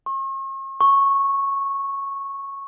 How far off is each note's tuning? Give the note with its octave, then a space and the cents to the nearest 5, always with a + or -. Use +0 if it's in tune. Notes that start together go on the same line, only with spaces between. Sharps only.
C#6 -45
C#6 -10